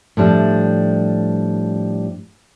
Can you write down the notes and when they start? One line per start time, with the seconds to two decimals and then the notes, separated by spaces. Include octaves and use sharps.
0.17 A2 F3 G3 D4